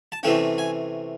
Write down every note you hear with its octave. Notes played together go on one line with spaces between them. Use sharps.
A5
C3 E3 A3 C#4 G5
G#5